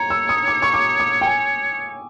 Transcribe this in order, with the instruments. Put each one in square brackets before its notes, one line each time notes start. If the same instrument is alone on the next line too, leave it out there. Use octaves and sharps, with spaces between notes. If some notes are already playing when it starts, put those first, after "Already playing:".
Already playing: [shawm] C#5 [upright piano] A#5
[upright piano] E6
D#6
D6
C#6
D6
D6
G5
G#5